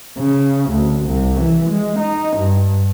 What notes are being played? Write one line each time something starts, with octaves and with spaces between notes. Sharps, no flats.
C#3
D2
C2
E3
G#3
D#4
G2